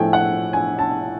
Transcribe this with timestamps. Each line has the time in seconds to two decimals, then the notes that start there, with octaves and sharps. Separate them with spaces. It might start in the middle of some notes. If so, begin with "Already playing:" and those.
Already playing: A2 F3 A3 G5 G#5
0.13 F#5
0.53 G#5
0.79 A5